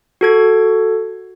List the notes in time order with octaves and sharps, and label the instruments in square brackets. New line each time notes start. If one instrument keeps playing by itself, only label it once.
[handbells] F#4 A4 G#6